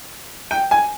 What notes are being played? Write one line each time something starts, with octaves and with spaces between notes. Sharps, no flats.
G5
G#5